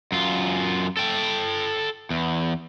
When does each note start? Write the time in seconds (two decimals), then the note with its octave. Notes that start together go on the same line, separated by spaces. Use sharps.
0.12 F#2 F4
0.97 A4 G5
2.10 E2